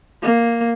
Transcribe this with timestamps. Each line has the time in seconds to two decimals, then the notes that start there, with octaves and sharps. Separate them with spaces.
0.22 A#3